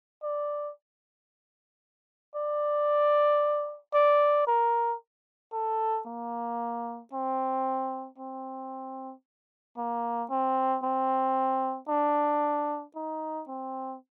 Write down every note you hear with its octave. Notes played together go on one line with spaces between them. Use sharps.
D5
D5
D5
A#4
A4
A#3
C4
C4
A#3
C4
C4
D4
D#4
C4